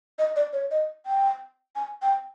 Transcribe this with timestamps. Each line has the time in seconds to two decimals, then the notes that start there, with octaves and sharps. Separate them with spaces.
0.19 D#5
0.36 D5
0.53 C#5
0.71 D#5
1.06 G5
1.76 G#5
2.02 G5